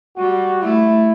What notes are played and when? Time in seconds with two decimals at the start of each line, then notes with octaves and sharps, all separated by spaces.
0.17 G3 F#4
0.62 A3 E4